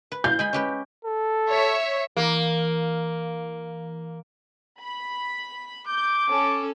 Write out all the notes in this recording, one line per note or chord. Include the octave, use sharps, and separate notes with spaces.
B4
F5 G6
G#3 G#5 B5
C#4 G4 B4
A4
C#5 E5
E3 A#3
B5
D6 G6
C#4 A4